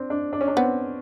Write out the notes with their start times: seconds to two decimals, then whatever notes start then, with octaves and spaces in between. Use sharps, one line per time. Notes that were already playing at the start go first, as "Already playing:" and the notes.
Already playing: C4 D4
0.10 D4
0.33 D4
0.41 C#4
0.48 D4
0.57 B3 C4